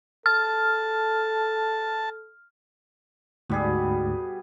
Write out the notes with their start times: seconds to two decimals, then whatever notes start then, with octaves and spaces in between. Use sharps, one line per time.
0.26 A4 A5 F6
3.50 D2 G#2 B2 G3 G#4